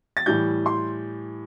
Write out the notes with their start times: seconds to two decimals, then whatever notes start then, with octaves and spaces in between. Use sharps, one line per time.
0.17 A6
0.26 A2 E3 G3 G6
0.66 C6